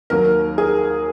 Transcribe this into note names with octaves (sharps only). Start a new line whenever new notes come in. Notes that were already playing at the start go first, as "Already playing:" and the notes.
D#2 D#3 F#3 A#3 A#4
G#4